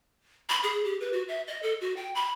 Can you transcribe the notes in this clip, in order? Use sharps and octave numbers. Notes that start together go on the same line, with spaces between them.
B5
G#4
G4
B4
F#4
E5
D#5
A4
F#4
G5
B5